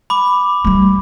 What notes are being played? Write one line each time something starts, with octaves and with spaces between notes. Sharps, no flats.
B5 D6
G3 A3